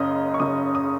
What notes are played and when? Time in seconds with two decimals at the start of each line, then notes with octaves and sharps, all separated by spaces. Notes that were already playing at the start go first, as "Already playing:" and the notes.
Already playing: F#1 F#2 C#3 D#5
0.34 C#6
0.40 F#1 F#2 C#3 D#6
0.75 D#6